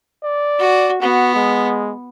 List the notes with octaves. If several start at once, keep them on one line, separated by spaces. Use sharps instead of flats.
D5
F#4
B3 F#4
G#3